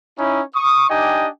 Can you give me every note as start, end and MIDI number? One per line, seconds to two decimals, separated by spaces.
0.18 0.41 61
0.18 0.41 63
0.18 0.41 64
0.55 0.88 85
0.55 0.88 87
0.90 1.28 62
0.90 1.28 63
0.90 1.28 67
0.90 1.28 75
0.90 1.28 79
0.90 1.28 80